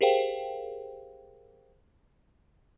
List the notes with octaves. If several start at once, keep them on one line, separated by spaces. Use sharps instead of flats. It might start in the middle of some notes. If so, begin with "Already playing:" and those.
G4 G#4 A#4 C5 F5 G5